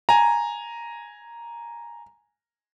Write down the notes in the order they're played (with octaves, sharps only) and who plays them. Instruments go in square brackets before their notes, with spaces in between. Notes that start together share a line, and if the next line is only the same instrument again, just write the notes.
[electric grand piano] G#5 A#5